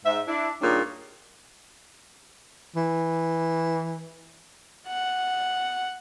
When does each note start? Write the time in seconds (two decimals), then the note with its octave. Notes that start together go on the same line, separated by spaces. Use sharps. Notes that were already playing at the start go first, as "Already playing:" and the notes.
0.05 G#2 E5
0.27 D4 E4
0.61 D#2 A#2 C#3 G3 A#3 D4
2.76 E3
4.88 F#5